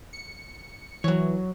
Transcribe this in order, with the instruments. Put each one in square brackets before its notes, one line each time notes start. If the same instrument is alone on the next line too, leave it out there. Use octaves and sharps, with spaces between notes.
[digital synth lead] C#7
[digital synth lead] E3 [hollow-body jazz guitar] F#3 C#5